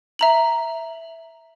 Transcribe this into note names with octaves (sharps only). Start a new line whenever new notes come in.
E5 A#5 F#7